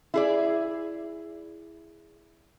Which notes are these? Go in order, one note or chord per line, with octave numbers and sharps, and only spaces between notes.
E4 G#4 D5